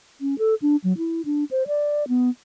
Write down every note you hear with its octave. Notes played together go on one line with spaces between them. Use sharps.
C#4
A4
D4
F#3
E4
D4
C5
D5
B3